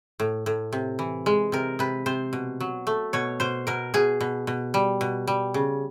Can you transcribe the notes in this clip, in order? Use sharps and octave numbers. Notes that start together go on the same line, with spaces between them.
A2
A2
C3
E3
G#3
C3 A#4
C3 B4
C3 C5
B2
F#3
A3
B2 C#5
B2 C5
B2 A#4
B2 G#4
B2
B2
G3
B2
G3
C#3